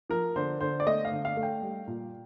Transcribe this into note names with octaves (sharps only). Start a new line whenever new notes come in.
F3 A#4
D3 C5
D3 C5
D5
A3 D#5
F5
D3
F5
A3
G5
G3
A#2